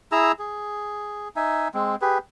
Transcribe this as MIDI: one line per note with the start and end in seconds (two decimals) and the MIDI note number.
0.12 0.32 64
0.12 0.32 68
0.12 0.32 82
0.12 0.32 88
0.39 1.29 68
1.36 1.68 63
1.36 1.68 76
1.36 1.68 80
1.74 1.96 56
1.74 1.96 60
2.01 2.18 67
2.01 2.18 68
2.01 2.18 71